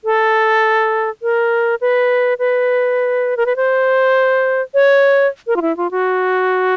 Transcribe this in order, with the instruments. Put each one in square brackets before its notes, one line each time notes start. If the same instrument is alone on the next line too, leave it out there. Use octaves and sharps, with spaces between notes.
[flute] A4
A#4
B4
B4
A#4
B4
C5
C#5
A#4
F4
E4
F4
F#4